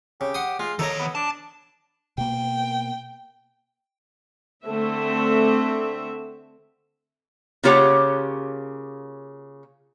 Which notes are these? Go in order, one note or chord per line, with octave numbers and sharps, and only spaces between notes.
C#3 G4
F#5 C6 D#6
G#3 F4
D#3 A4 A#4 C#5 D#5
B3
D4 A5
B2 A#3 G5
D3 A3 C4 E5
C#3 A#3 F4 G4 C#5 F#5